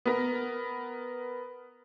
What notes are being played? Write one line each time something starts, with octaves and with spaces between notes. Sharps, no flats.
B3 A#4